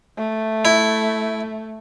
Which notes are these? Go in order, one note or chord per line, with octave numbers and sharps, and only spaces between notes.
A3
E4